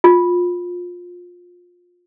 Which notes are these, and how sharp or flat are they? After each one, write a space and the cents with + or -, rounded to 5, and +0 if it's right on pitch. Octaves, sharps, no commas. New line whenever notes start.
F4 +20